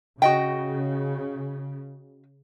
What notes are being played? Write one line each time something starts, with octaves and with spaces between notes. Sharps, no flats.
C#3 F#4 D#5 G5